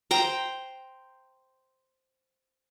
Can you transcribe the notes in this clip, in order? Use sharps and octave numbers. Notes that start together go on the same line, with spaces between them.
C5 G5 A#5